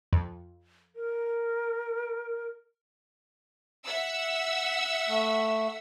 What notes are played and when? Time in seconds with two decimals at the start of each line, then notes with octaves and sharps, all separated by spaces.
0.13 F2
0.96 A#4
3.86 E5 F#5 E6
5.08 A3